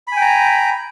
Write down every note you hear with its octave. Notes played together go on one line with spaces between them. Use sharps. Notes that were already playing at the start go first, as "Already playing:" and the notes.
G5 G#5 A#5 B5